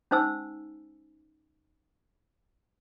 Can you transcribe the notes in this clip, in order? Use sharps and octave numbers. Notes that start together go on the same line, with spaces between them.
C#4 D#4 C5 G#5 E6